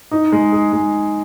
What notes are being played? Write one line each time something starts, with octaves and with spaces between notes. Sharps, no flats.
D#4
G#3
G#4
G#3